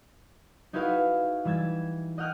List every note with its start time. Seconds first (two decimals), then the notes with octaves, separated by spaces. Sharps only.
0.73 D#4 E4 F#4 G#4 B4 F5
1.45 E3 G3 E6 G#6 A6
2.18 D#5 F#5 G5 F6 F#6 G#6